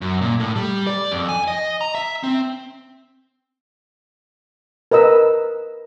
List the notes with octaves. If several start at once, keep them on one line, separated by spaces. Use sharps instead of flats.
F#2
A#2
A2
G3
D5
F2
G#5
D#5
A#5
E5
C4
A#4 B4 D#5 E6